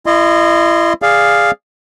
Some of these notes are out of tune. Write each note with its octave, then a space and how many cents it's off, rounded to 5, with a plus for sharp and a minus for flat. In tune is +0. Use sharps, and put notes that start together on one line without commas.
E4 +30 D#5 -25 C6 +0
G#4 -10 D5 +0 F5 +0